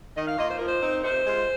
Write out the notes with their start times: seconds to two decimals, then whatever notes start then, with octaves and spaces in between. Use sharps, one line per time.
0.16 D#3 D#5
0.27 F5
0.38 A#3 F4 D#5
0.49 C5
0.58 F3 A#4
0.67 C5
0.82 C4 D#4
1.04 C3 C5
1.27 G#3 F4